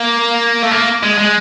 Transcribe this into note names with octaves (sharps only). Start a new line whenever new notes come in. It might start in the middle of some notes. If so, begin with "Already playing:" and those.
Already playing: A#3
A3
A#3
G#3
G#3